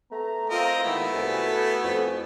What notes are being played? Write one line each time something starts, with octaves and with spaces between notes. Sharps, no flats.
A3 B3 A#5
C4 F4 A#4 D#5
D#2 G#2 D#3 A3 B3 E4
C2 F#4 B4 G#5
A4
F2